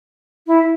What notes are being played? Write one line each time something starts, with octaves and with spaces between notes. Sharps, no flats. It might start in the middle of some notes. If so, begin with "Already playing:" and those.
E4